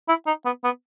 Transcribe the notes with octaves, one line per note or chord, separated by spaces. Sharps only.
E4
D#4
B3
B3